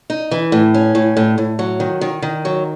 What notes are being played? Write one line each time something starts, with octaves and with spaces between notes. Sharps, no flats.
D#4
E3
A2
C#4
A2
A2
A2
F#3
D#3
D#3
D#3
F#3